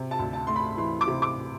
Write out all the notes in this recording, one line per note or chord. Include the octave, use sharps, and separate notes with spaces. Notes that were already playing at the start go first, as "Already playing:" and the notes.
Already playing: C3
A5
D2
A5
A3 C6
B5
E3 C6
D6
C3
D6